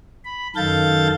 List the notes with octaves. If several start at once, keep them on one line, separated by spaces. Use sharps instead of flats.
B5
F#2 D#3 A4 F5 G6 A6